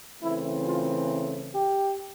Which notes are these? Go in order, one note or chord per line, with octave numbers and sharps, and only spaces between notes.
C#3 E3 A3 C4 E4
F4
G4